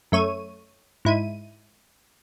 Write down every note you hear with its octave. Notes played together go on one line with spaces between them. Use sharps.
F#2 A3 C#5 D#7
G#2 E4 D#7